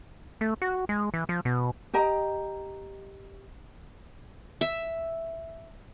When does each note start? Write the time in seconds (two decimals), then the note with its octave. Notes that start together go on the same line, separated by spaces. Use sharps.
0.41 A3
0.62 F#4
0.89 G#3
1.14 E3
1.29 F3
1.45 B2
1.93 G4 D#5 G5 A#5
4.61 E5